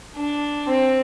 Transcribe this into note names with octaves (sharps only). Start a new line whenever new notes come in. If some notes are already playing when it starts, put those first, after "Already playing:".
D4
C4